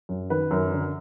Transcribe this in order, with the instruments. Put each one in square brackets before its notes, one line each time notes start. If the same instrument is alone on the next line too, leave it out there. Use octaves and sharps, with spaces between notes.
[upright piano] F#2
D#3 B4
F#2 A#4
D3